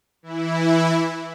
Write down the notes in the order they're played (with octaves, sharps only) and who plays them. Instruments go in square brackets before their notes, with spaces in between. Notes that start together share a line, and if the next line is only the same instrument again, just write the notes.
[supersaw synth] E3 E4